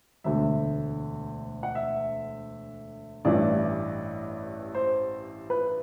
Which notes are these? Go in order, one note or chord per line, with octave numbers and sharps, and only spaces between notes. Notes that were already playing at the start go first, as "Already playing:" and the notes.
E1 D2 D3 E5
F#5
E5
A1 G2 E3 G3 D5
C5
B4